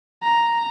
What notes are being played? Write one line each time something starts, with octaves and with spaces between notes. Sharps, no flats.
A#5